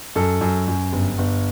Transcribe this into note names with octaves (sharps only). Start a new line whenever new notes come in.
F#2 A4
F#2
F#2
G1
G1